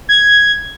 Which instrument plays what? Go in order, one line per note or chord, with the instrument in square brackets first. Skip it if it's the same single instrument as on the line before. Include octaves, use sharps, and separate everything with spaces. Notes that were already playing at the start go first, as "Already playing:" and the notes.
[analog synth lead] G#6